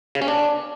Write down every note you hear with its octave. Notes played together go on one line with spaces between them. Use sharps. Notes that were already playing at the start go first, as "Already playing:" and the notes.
C#3
C#4
D4